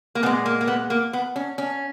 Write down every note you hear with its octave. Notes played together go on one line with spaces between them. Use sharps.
A#3
A#2 G#3 B3
A#3
A#3
B3
A#3
B3
C#4
C#4